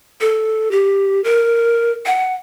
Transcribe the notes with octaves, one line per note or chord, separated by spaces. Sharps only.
A4
G4
A#4
F#5